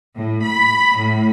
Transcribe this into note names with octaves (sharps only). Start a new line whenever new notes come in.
A2
B5
A2